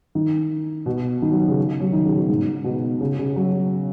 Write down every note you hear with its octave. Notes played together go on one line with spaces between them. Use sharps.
D#3
B2
D#3
F#3
C#3
F#3
D#3
C#3
B2
G#2
B2
C#3
C#3
F#3